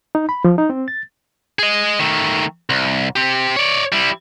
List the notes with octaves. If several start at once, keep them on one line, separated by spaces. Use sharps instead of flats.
D#4
B5
F3
D#4
C4
A6
G#4 D#5
D#3 A3
C2
C4 G4
C#5 D5
G3 E4